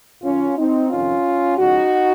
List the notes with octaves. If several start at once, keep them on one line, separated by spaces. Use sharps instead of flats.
F#2 D#3 C#4 F4
C4 D#4
F2 C3 D#3 C#4 F4
C#2 C#3 F3 D#4 F#4